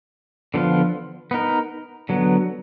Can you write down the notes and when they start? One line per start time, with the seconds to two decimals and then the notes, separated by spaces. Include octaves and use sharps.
0.54 D3 F3 B3 F4
1.31 B3 D#4 A#4
2.09 D3 F#3 B3